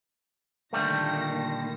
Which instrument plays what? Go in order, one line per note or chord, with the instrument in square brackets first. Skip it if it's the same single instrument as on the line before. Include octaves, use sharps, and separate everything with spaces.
[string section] A#2 D#3 A#6 [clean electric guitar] D3 G3 A3